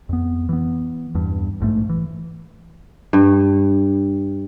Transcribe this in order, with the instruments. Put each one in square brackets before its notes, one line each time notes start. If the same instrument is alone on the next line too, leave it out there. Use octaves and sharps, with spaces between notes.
[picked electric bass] F2 B3
E3 B3
E2 G2
A#1 G#2 D3 A3
E3
[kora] G2